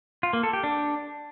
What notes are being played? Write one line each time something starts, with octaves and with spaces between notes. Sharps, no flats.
F4
A#3
A4
G4
D4